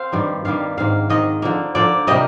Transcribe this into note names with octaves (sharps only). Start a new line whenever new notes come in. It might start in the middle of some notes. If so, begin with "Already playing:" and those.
Already playing: C4 F5
G2 D#3 G3 A#3
G2 D#3 G3 A#3 F5
G#2 D#3 A#3 F5
G#2 D#3 A#3 D#5
D3 F3 A#3
D3 F3 A#3 D5
C3 G3 A#3 D#5